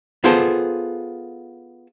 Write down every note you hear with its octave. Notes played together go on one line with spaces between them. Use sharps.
B3 F4 G#4 A4 C5